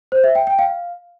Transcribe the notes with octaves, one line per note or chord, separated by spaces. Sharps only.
C5
E5
G5
G5
F5